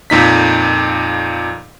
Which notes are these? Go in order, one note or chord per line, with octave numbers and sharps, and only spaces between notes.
F2 A#2 D#4 B6